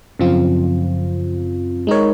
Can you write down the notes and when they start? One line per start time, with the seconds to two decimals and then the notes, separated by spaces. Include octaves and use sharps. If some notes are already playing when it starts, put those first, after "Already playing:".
0.19 F#2 C#3 F3 C4 F4
1.87 G#3 D#4 A#4 C#5